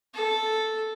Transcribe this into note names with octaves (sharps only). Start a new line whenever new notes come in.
A4